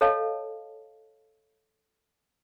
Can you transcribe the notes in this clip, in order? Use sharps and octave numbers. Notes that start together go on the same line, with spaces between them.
A4 C#5 D#5 F5 A5